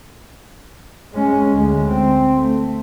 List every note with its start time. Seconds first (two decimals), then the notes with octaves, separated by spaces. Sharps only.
1.13 G#3 C#4
1.53 D2 G#3
1.90 C4
2.38 A3